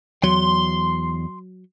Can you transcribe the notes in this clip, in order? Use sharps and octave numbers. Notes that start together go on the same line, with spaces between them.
E2 F#3 C6